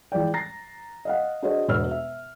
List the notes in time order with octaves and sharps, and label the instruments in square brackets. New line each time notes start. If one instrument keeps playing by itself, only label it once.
[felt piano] E3 F3 G#3 D5 G5
A#5 A6 A#6 C7
D#5 F5 F#5
D4 F#4 G#4 C5 C#5 D#5
E1 B2 D4 C#5 E6 F6
E5